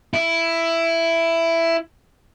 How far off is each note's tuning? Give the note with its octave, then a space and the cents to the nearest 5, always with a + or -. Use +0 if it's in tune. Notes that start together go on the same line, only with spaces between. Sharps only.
E4 +10